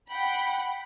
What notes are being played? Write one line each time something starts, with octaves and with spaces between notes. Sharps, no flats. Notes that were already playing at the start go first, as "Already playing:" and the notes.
F#5 G5 B5